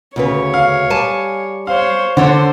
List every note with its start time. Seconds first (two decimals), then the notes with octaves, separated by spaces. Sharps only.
0.16 D2 C#3 B4 C#5
0.54 F5
0.90 G3 G#5 A5
1.67 C5 C#5 F5
2.17 D3 D4 C5 C#5 F#5